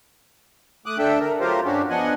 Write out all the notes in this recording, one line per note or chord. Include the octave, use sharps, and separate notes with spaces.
A3 D6 D#6 F#6
D2 D4 A4 E5 G5
A#4
F#3 A3 F4 G4 A#4 C5
G2 C#4 D4 F#4 G4
F3 B3 D4 D#5 F#5 G#5